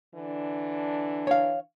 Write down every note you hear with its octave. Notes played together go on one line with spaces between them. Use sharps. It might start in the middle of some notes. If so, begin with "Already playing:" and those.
D3 E3 D4
C#5 F5